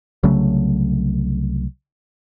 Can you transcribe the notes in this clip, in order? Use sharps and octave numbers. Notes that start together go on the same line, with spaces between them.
C2 C#3 F#3 A3